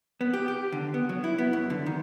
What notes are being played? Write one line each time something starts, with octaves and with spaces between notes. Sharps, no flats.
B3
G4
G4
D3
B3
F#3
E4
B3
F#2
D3
D#3